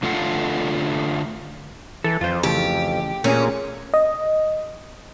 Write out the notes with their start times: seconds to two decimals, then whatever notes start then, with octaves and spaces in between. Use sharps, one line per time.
0.03 D3 A3 F4 A4 F5 F#5
2.04 E3 A4
2.21 F2 F4 C5
2.43 C#3 E3 A3 G4
3.24 A#2 A3 A#3 C#4 G#4
3.94 D#5